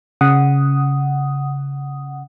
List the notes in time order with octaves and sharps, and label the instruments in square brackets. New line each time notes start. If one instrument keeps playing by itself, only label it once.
[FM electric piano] C#3 F#5 D#6